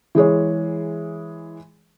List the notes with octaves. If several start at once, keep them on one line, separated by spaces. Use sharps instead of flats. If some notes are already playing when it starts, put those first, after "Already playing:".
E3 G#3 G#4 C#5